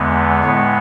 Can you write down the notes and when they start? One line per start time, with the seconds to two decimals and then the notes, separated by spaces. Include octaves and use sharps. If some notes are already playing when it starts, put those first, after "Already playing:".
Already playing: E2 D3 G#3 B3
0.43 A2 G#3 B3 C#5